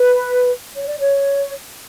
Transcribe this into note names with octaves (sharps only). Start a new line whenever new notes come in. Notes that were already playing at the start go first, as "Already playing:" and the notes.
Already playing: B4
C#5
D5
C#5